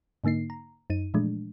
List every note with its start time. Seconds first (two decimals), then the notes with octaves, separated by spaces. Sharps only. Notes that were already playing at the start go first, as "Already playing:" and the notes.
0.24 G#2 D3 A#3 D#4 C7
0.50 A#5
0.90 F#2 D#4 D#7
1.14 A#2 E3 F3 G#3 A3 D4